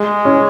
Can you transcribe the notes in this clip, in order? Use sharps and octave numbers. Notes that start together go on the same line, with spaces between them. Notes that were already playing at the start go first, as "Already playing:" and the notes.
Already playing: G#3
C#4